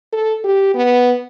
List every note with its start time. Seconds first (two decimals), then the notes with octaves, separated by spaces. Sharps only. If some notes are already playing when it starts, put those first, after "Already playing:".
0.13 A4
0.44 G4
0.74 B3